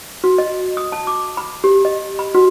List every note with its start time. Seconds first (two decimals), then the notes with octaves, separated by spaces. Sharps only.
0.24 F#4
0.38 D#5
0.77 D#6
0.92 A5
1.07 D6
1.37 B5
1.64 G4
1.85 D#5
2.19 B5
2.35 F#4